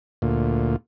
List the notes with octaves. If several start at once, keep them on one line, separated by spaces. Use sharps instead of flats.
D2 A#2